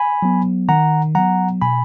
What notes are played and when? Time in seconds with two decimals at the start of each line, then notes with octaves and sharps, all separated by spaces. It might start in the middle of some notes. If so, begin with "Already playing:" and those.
Already playing: G#5 B5
0.22 F#3 B3
0.69 D#3 F#5 A#5
1.15 F#3 B3 F#5 A#5
1.61 B2 G#5 B5